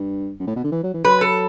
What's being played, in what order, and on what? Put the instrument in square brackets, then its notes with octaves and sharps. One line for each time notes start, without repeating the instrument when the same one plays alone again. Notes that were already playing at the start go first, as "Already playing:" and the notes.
Already playing: [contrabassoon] G2
F#2
A2
B2
D3
E3
F#3
E3
[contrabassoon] F#3 [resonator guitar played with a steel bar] B4
[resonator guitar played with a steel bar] A4